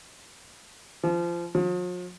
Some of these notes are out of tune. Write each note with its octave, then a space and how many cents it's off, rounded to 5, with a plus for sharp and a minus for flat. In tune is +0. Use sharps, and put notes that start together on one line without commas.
F3 -25
F3 +45